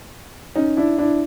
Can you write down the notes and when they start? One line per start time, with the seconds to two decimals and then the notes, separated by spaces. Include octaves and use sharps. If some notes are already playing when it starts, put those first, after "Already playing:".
0.56 C#4 D#4
0.77 D4 E4
0.98 D4 E4